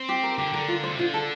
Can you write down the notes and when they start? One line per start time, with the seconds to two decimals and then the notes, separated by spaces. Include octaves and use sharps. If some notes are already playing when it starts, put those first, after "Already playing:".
Already playing: C4
0.09 G4
0.23 A#4
0.38 D3 G4
0.53 D3 A#4
0.68 F4
0.83 C3 C5
0.99 D3 F4
1.14 A4